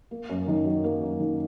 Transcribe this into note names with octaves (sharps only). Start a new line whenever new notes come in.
A#3
F#2
D#3
F#3
A#3
F#2
D#3